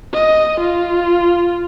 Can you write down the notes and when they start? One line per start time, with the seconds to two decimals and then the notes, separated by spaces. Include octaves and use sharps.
0.13 D#5
0.60 F4